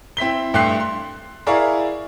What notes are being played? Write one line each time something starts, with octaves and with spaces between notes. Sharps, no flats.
C4 E4 B6 G7
G2 A3 G4 C6 F#6 C7
C6
E4 G#4 A#4 D5 F5 C#6